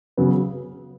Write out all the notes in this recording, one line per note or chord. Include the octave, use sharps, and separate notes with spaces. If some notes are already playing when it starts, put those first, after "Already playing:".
C#3 F#3 B3